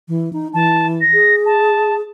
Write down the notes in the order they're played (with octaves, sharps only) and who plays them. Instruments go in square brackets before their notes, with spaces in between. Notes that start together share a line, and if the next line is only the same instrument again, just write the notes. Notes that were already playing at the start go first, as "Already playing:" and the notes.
[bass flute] E3
D#4
[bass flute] E3 [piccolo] A5
[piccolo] A#6
[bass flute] G#4
[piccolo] A5